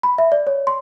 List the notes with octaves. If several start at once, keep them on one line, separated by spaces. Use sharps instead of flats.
B5
E5
D5
C#5
C6